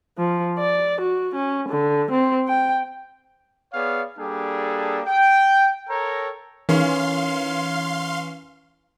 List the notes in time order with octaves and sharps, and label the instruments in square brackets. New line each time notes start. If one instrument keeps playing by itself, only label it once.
[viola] F3
D5
F#4
C#4
D3
C4
G5
[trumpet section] B3 G#4 C#5 D5 F5
G3 A#3 D4 G#4 A4
G5
A4 A#4 C#5 G5 A#5
[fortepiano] D#3 [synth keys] E3 [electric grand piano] C#4 [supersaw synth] F5 C6